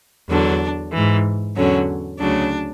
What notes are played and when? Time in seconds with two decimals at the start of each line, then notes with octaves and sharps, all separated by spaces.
0.29 E2 D3 F#3 D4
0.93 G#2 E3
1.57 E2 D3 F#3 C#4
2.20 D2 C#3 F#3 D4